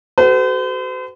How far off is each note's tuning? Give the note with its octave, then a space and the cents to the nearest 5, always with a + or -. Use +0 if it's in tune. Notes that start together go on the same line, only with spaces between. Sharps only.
F#4 +40 A4 +0 C5 -45